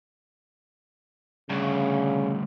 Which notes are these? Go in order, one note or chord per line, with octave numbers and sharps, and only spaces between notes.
D2 G2 C#3